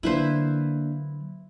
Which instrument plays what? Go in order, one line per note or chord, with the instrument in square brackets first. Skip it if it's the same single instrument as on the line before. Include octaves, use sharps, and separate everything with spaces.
[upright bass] D3 F#3 [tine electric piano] A#3 D4 [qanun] E4 B4 C5